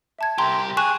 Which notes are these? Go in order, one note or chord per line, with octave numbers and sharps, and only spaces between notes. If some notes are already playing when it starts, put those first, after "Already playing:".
E5 A5 G#6
C2 G4 A#5 C6
G#4 C#6 F#6 E7